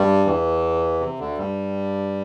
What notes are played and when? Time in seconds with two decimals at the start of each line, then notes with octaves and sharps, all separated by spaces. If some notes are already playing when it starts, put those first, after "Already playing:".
Already playing: G2 G3
0.25 E2 E3
1.00 C3
1.19 D2 D3
1.38 G2 G3